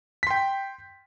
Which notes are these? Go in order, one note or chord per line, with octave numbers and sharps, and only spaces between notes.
G5 C6 B6